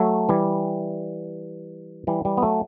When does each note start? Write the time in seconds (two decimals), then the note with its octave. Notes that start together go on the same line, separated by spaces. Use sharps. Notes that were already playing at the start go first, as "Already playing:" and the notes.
Already playing: F#3 A3
0.29 E3 G3
2.07 E3 G3
2.25 E3 G3
2.37 B3
2.42 F#3 A3